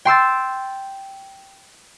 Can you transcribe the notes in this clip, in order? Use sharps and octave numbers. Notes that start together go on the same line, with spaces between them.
G5 C6 E6 A6